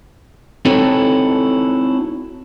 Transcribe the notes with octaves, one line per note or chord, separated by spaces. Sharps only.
C4 D#4 E4 F#4 A4 C#5